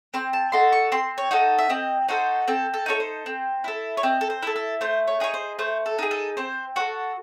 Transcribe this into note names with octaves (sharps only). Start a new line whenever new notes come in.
C4 C6
A5
D#4 F#4 A4 C6
C#6
C4 C6
C#5
D#4 F#4 A4
E5
C4 D#5
D#4 F#4 A4 C5
C4 A4
A4
D#4 F#4 A4 C#5
C5
C4
E4 A4
C#5
C4 D#5
A4
C5
E4 A4
A4
A3 C5
C#5
D#4 G#4 C#5
C5
A3 C5
A4
D#4 G#4
A4
C4 C5
F#4 A4 C5